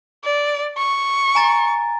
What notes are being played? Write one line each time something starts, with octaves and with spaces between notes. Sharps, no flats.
D5
C#6
G#5 A#5 A6